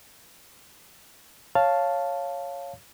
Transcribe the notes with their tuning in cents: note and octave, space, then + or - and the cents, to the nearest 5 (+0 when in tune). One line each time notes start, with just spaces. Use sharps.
C#5 +0 F5 +0 A5 +0